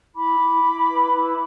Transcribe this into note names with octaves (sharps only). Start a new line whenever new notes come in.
E4 B5 D6
E4
E4
B4
E4